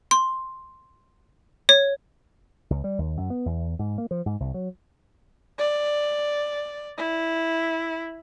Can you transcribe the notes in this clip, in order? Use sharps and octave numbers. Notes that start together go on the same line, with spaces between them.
C6
C#5
C#2
G3
D#2
F#2
B3
E2
G#2
A#3
F3
G#2
C2
F#3
D5
E4